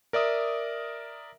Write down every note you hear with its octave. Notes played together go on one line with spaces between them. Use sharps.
A#4 D5 E5 D#6